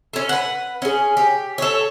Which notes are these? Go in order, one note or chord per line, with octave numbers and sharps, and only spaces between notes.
C#4 A4
B4 F#5
C#4 G#4
G4
A4 C#5